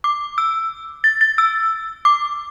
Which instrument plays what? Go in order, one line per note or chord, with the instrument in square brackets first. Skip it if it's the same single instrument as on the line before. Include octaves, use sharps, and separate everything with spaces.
[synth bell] D6
E6
A6
A6
E6
D6